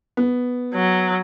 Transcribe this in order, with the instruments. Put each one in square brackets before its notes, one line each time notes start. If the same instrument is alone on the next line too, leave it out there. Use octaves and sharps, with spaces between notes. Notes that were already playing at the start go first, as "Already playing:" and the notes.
[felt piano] B3
[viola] F#3